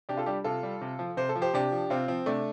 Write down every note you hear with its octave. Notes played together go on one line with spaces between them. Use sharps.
C3 D4 G4
F4 A4
G3 D4 G4
C3 F4 A4
G3
C3
F3
C3 C5
A4
F3
G4 C5
C3 D4 G4
F3
C3 C4 F4
F3 C4
C3 A3 D4